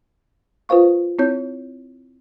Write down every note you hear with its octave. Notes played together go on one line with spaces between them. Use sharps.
F4 B4 C5 F5 C#6
C4 E4 C#5 G6